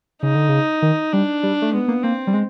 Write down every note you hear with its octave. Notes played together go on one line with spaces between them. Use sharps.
C#3 D#4
D3
C#3
D#3
G3 D4
G3
A3
G#3 B3
A#3
A#3 C4
G3
G#3